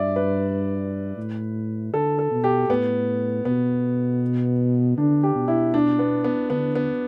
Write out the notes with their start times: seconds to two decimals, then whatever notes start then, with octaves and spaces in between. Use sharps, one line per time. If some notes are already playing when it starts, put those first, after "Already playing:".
Already playing: G2 D5 E5
0.16 B4
1.17 A2
1.93 D3 A4
2.19 A4
2.31 B2
2.44 G4
2.69 A2 B3
3.45 B2 B3
4.98 D3 D4
5.23 G4
5.36 B2
5.48 E4
5.74 D4
5.99 B3
6.24 B3
6.50 D3 B3
6.75 B3